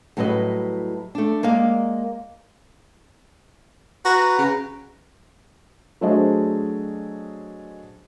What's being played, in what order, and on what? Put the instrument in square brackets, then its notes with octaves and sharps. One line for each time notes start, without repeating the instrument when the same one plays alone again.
[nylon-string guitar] A2 F#3 G3 B4 C#5 D#5
A3 D4
G#3 A#3 D5 F5
[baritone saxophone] F#4 [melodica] B4 A#5
[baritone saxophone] C#3
[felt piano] F#3 A3 D4 G#4 C5 D#5